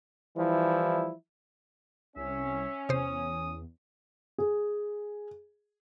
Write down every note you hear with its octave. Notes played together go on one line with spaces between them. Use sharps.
E3 F3 G3 E4
C2 C#4 E5
E2 C3 C5 D#6
G#4